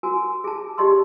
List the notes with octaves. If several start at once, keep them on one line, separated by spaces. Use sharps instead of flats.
F#4 A#4 G#5
G#4 A5
G4 D5 D#5 A5 C6 E6